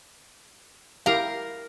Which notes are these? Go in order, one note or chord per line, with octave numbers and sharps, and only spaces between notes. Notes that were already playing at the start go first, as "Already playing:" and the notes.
E4 G4 A#4 F5 A#5